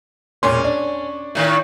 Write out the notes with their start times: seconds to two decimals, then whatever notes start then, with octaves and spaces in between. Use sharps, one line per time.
0.43 E1 A#2 C#4 C6
0.64 D4
1.35 A2 D#3